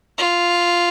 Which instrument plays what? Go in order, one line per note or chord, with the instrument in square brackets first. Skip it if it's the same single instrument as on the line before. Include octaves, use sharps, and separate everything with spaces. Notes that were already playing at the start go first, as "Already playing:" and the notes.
[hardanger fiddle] F4